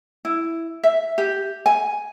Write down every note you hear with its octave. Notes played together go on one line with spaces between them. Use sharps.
E4
E5
G4
G#5